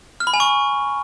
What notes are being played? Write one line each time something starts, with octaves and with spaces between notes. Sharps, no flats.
F6
B5
G#5
C#6